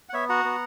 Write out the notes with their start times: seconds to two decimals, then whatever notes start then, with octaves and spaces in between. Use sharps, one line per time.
0.09 F#5
0.13 B3 C#5 E5
0.29 F#4 F#5 A#5
0.45 B3